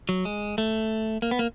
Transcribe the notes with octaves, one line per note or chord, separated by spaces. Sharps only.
F#3
G#3
A3
A#3
B3
A#3